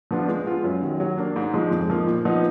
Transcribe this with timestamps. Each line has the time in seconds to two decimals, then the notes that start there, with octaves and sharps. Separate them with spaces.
0.11 F3 B3 D4 F4
0.28 G#3
0.46 B3 F4
0.64 F#2
0.82 D#3 F#3
1.00 F#3
1.18 A#3 D4
1.36 G#2
1.54 F3 G#3 D#4
1.71 F2
1.90 F3 A#3 D#4
2.08 A#2
2.25 F3 B3 D#4